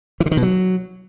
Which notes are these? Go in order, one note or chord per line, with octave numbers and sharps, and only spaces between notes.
E3
D3
D#3
B2
F#3